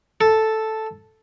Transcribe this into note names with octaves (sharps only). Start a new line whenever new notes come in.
A4